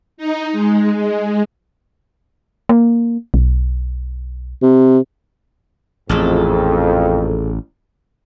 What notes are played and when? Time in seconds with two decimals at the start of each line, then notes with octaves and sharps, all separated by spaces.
0.18 D#4
0.53 G#3
0.96 G#3
2.69 A#3
3.34 B1
4.63 C3
6.10 A1 F2 A#2 G#4 A4